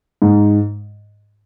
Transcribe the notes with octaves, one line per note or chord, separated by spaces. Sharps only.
G#2